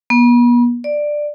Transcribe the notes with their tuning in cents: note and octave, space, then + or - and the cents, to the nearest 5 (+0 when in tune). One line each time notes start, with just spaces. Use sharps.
B3 -40
D5 +10